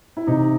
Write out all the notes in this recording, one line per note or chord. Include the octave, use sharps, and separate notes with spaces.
E4
C3 D#4